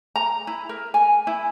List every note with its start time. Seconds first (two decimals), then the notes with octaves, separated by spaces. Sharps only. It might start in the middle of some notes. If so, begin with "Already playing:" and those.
0.16 A#5
0.47 E4
0.69 A#4
0.94 G#5
1.27 E4